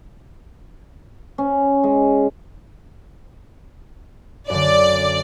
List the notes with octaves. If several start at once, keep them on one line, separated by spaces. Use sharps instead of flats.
C#4
G#3
F#2 D3 D5